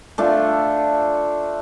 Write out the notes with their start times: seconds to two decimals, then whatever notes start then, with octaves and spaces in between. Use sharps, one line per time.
0.18 A3 D4 F4